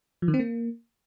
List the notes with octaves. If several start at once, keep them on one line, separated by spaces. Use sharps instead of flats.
F3
D#3
C4
A#3